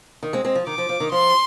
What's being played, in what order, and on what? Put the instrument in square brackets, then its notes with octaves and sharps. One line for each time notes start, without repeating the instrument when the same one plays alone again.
[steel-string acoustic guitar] D#3
G#3 C4
G#3 C4
F3
[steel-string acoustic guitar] D#3 [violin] D6
[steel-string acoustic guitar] F3
F3
D#3
[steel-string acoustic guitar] F3 [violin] C6